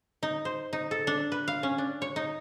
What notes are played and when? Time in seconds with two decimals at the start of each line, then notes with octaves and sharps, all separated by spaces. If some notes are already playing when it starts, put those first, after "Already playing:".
0.23 D#4
0.45 C5
0.73 D#4
0.91 A4
1.07 D4
1.32 B4
1.48 F5
1.63 C#4
1.78 D4
2.02 C#5
2.16 D#4